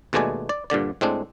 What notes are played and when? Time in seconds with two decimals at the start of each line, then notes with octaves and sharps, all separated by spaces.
0.13 D#2 B2 G#3 A3 D5 G#5
0.49 D5
0.70 G2 A#2 D3 D5
1.01 A2 G#3 C4 D4